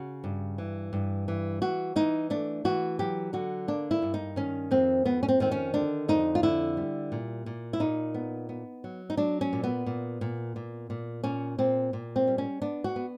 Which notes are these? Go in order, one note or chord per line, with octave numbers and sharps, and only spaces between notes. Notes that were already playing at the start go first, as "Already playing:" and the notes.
Already playing: C#3 F#4
G2
E3
G2
E3
E3 F#4
E3 D#4
A3 D4
E3 F#4
F#3 G4
D3 F#4
A#3 D4
E4
G2
D#4
D#3 C#4
F2 C4
F2 B3
C#4
C4
D#3 C4
C#4
D3 D4
F2 D#4
F4
D3 E4
G3
A#2
A#2
E4
A#2 D#4
B3
B3
F#3
D#4
F#3 D4
C#4
A#2
B3
A#2
A#2
A#2
A#2
A#2 C#4
A#2 C4
A#2
C4
G3
C#4
B3 D4
F#4
B3